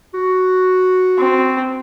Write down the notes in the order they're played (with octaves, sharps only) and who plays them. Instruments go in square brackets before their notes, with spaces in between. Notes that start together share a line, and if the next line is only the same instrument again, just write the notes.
[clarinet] F#4
[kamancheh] C4